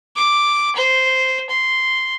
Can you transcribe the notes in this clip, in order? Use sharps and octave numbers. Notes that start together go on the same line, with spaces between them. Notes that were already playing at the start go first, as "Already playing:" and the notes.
D6
C5
C6